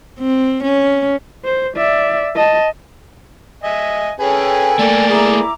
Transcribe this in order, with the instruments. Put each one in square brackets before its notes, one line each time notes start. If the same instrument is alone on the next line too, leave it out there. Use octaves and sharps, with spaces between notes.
[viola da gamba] C4
C#4
[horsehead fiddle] C5
D5 E5
D#5 A5
[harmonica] D#5 E5 G#5
[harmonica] C#4 G#4 B4 [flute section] A4 G5 [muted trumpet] G#5
[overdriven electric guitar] A3 A#3 [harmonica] D5
[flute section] E4 A#5 D6 [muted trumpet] G#4